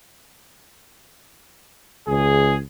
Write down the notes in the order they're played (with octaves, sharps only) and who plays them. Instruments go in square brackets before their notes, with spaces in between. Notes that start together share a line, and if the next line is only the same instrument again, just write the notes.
[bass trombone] C#2 [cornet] G#4